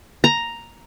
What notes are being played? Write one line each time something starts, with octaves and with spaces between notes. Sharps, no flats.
A#5